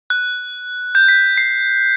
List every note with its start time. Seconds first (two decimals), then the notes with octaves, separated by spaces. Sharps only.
0.10 F#6
0.95 G6
1.08 B6
1.37 C7